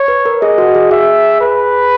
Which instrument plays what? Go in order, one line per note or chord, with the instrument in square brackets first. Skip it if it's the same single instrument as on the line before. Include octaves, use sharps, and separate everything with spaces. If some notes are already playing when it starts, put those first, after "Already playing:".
Already playing: [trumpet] C#5
[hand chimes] B4
A#4
[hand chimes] G#4 [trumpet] D#5
[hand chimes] F#4
G#4
[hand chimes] G#4 [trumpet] E5
[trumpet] B4